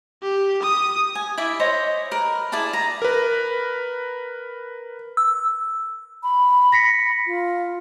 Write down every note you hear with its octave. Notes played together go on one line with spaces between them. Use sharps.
G4
D#6
G#5
E4 D5 E5
C5 C#5 D#5
A#4 B4
E4 G#4 D5 A5
A#5
A#4 B4
E6
B5
A#6 B6 C#7
F4